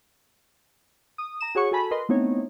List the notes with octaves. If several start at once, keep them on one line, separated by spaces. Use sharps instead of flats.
D#6
A#5 E7
F#4 G#4 C#5 F#5 C#6
F#4 A4 G#5 A5 B5
A#4 B4 D#5 C6
A3 B3 C4 D#4 E4 C#5